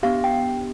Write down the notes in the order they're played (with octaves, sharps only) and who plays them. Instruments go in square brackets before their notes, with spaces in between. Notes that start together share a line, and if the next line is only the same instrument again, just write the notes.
[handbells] B3 D4 G4 F5
G5